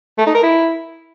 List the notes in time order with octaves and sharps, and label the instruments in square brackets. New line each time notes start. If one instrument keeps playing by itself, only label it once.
[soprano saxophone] A3
D#4
A#4
E4